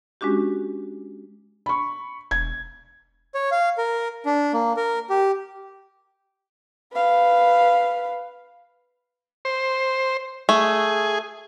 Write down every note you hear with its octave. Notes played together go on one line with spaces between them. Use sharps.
G#3 C#4 D4 F#4 G4
B5 C#6
E1 G#6
C#5
F5
A#4
D4
A#3
A#4
G4
B4 F5
C5
A3 G#4